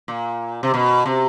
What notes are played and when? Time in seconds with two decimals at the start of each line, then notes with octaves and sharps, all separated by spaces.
0.08 A#2
0.63 C3
0.74 B2
1.06 C3